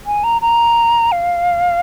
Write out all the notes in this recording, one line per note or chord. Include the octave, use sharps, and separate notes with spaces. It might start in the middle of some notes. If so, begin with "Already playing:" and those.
G#5
A#5
A#5
F5